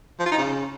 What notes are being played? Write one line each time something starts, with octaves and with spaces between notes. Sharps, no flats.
F3
F4
D#4
C#3